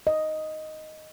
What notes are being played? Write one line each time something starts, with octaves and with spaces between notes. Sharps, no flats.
D#5